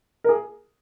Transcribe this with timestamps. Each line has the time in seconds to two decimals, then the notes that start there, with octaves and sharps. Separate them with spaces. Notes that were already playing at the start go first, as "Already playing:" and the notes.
0.24 A#4
0.29 G#4